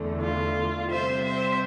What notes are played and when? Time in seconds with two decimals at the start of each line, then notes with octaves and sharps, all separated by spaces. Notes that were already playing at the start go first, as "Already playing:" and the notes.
Already playing: E2 D3 A3
0.21 F4
0.90 C3 G3 C4 C5 E5
1.24 C5 E5